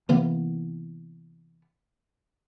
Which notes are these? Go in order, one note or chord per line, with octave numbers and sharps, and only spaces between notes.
C3 E3 A#3 B3